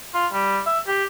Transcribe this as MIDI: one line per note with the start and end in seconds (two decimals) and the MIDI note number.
0.14 0.27 65
0.33 0.60 55
0.67 0.79 76
0.87 1.05 67